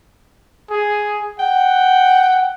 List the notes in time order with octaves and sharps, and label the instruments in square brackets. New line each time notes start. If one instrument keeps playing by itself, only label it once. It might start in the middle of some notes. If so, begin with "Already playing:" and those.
[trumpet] G#4
[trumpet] F#5 [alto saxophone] G5